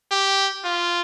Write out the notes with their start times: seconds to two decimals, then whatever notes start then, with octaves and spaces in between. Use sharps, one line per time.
0.11 G4
0.64 F4